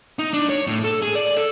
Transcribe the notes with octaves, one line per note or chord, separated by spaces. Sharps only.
D#4
D4
C#5
A2
A4
G#4
D5
A4